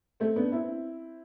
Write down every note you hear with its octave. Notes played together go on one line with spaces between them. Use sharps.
A3 C4
B3 D4
C4 E4